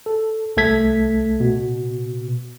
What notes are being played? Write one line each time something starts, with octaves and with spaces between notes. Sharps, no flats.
A4
C2 A3 A4 G#6 B6
B2